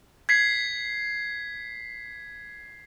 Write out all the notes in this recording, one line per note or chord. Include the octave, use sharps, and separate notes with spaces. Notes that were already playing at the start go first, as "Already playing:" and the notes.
G#6 B6 C7